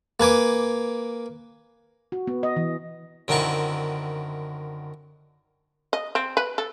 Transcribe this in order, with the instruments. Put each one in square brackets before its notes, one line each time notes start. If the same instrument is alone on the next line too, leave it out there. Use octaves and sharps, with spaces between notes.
[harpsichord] A#3 B4 G#5 D6
[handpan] F#4
B3
D#5
E3
[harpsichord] F#2 D3 D#3 C4 E4 C#6
[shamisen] D#5
C4
B4
A4